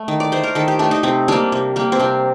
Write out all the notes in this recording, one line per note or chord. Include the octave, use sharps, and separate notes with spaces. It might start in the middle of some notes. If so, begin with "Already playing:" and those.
Already playing: A3
D#3
D5
A3 C5
A#4
D#3 A4
G4
A3 D4
D#4
C3 C4
G3 A#3 D4
C3
G3 A#3
C4
C3 D4